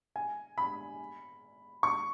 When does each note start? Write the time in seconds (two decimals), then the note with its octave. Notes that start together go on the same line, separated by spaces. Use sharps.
0.16 G#5
0.58 B5
1.83 C#6